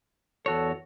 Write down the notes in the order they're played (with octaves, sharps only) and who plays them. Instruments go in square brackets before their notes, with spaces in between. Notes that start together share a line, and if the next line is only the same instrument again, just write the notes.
[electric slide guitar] E2 F#4 C#5 [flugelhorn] A4